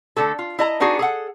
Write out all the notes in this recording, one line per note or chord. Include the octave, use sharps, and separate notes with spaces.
D3 A3 A4
F4
E4 D#5 A#5
B3 D4 D#4 F#4 G#4
G#4 A4 F#5